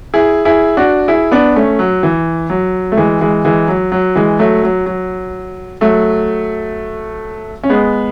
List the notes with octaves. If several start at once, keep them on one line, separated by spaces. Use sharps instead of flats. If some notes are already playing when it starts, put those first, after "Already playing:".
E4 G#4
E4 G#4
D4 F#4
E4 G#4
B3 D4
A3 C#4
F#3
E3
F#3
A3
E3 G#3
E3 G#3
E3 G#3
F#3
F#3
E3 G#3
F#3 A3
F#3
F#3
F#3 A3
C#4
G#3 B3